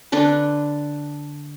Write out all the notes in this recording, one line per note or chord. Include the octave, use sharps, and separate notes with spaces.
D3 D4 B4